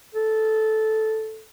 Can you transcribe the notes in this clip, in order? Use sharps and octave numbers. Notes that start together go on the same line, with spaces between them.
A4